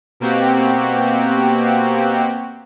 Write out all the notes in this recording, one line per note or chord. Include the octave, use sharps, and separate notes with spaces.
B2 A#3 C4 F#4 G4